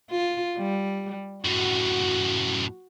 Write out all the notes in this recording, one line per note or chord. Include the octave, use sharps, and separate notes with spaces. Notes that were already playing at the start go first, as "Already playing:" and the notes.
F4
G3
F#2 A2 F#4